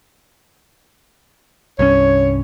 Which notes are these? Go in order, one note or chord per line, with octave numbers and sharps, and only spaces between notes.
C2 G2 C#4 C#5